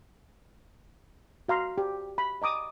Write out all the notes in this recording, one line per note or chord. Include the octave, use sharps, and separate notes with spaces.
F#4 F5 A#5 C6
G4
B5
D#5 A#5 D6 D#6